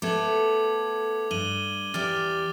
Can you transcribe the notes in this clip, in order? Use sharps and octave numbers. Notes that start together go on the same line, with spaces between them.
A3 B3 A4 D6 G#6 F#7
G2 D#7 F#7 G7
E2 G4 D5 D6 F6 A6